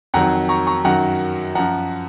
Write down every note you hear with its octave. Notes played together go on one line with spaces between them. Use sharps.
F2 D#3 F#3 F#5 A#5
A#5 C#6
A#5 C#6
F#2 D#3 F#3 F#5 A#5
F#2 F3 F#5 A#5